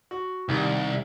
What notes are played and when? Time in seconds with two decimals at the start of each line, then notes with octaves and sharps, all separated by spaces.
0.11 F#4
0.49 C2 D#3 G3